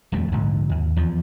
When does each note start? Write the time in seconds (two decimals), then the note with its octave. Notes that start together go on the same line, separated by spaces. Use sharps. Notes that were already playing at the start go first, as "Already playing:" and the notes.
0.12 D#1 F2 G3 A3
0.32 A#1 G#2 D3
0.70 D#2
0.96 E2 F3